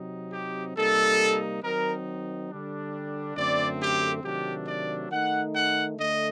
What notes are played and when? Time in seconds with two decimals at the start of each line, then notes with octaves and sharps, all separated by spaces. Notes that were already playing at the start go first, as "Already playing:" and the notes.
Already playing: C3 F#3 C4 D#4
0.33 G4
0.76 C3 G3 A#3 D#4 A4
1.63 D#3 F#3 C4 D#4 A#4
2.50 D3 G3 D4
3.37 F#2 D3 A3 C4 D5
3.81 G4
4.23 C3 D#3 F#3 A3 D4 G4
4.67 D5
5.11 D#3 A3 D#4 F#5
5.54 F#5
5.98 D3 A3 D#5